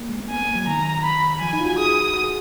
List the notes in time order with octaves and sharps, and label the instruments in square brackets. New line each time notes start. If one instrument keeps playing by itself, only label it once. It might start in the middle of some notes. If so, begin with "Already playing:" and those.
Already playing: [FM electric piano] A#3
G#3
A#3
[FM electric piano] B3 [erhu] G#5
[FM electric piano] A#3
F#3
[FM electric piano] D#3 [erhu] A#5
[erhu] B5
[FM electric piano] F3 [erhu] G#5
[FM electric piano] D#4
F4
F#4
[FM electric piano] G#4 [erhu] D#6
[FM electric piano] F#4
G#4